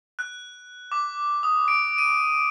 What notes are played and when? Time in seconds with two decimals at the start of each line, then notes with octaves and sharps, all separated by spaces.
0.19 F#6
0.92 D6
1.43 D#6
1.68 D7
1.98 D#7